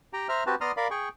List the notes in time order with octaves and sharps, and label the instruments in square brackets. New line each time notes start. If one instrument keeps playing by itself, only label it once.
[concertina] G4 G5 A#5
C5 E5 A#5 F6
C4 F#4 G4 B4 A5
B3 D5 A#5 C6 D#6 F6
A#4 D5 F5 B5
G#4 G5 C#6